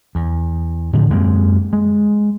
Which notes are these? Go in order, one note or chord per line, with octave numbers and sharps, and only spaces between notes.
E2
A2 D3 E3 F3
F#2 G#3 A#3 C4
G#3